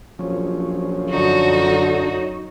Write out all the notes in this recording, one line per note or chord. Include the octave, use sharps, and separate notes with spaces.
A#1 F3 F#3 C#4
F#2 D3 D#4 F#4 C#5